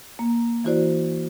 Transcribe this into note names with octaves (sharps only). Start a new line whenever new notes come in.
A#3
E3 E4 F#4 C5 D5